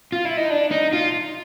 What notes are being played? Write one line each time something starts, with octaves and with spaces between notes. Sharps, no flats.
F4
E4
D#4
D4
D#4
F4